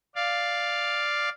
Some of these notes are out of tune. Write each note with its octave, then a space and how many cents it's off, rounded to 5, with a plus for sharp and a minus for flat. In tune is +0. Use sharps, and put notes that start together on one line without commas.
D5 +0 F5 +0